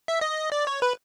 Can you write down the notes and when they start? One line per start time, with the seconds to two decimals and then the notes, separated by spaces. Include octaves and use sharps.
0.08 E5
0.21 D#5
0.52 D5
0.67 C#5
0.82 B4